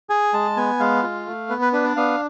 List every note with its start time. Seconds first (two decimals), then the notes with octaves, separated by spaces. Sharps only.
0.10 G#4 G#5
0.33 G#3 A5
0.57 B3 G#5
0.80 G#3 F5
1.03 F4
1.27 A3
1.49 B3 B4
1.62 B4
1.73 D4 B4
1.85 D5
1.96 B3 F5